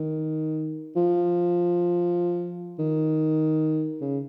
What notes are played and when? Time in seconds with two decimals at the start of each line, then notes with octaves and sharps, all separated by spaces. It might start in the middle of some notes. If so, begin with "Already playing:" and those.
Already playing: D#3
0.96 F3
2.79 D#3
4.01 C#3